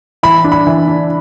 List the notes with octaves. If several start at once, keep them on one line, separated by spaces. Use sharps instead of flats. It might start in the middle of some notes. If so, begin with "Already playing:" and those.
E3 B5
D4
B5
E3
D4